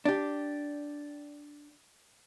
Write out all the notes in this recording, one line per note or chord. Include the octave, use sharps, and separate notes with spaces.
D4 G4